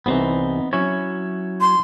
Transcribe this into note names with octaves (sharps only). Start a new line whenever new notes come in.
C2 E3 B3 C4 D#4
F#3 C#4 E4 C#5
C6